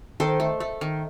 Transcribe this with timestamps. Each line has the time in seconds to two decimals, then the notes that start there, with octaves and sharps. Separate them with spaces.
0.20 D#3 A4 C5
0.40 A3
0.60 A3
0.81 D#3